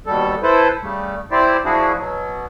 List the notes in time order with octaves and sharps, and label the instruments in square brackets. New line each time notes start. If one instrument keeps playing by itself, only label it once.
[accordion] D#2 B2 G3 A4
E4 A4 B4 C5
C#3 G3 A3
C4 E4 G4 C5 D5
F3 D4 E4 F#4 G#4
B2 F#3